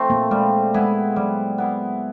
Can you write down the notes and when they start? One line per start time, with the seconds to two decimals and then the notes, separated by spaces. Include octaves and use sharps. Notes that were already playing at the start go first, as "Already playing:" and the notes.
Already playing: F3 A3 C4
0.10 A#3
0.31 G3 G#3
0.74 G#3 B3 E4 G#4
1.16 F#3 G3
1.58 B3 E4 G#4